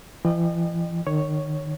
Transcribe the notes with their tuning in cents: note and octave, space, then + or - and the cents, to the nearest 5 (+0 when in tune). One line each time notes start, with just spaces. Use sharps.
E3 +40 D#5 -40 G5 +15
D#3 -30 C#5 +0